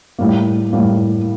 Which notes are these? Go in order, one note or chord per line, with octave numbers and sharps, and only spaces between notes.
A2 G3 A#3
A2 G3 A#3